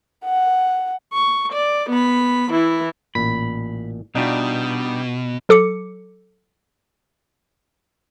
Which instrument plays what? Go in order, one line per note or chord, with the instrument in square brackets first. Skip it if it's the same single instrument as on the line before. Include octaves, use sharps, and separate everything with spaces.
[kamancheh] F#5
[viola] C#6
D5
B3 B5
E3 E4
[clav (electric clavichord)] A1 A#2 [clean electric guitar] B5
[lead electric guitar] B2 [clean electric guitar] G3 D4 D#4 [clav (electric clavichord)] F4 F#4 F#5
[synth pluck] F#3 A4 D6 C#7